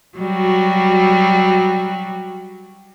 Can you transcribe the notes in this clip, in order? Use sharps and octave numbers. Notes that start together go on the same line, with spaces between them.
F#3 G3 F#4